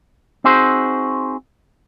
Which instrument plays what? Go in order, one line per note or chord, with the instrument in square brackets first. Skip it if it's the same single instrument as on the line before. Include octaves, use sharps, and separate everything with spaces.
[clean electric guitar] C4 D#4 F#4 G#4 C5